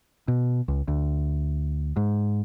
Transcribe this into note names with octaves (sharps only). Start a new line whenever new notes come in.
B2
C#2
D2
G#2